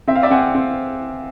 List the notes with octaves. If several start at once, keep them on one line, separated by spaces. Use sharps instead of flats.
C4 E5
F5
D5 E5
C4 F#5 G#5
C4